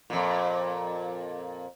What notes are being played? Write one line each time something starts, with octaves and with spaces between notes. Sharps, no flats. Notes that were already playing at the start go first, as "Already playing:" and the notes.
F2 A#2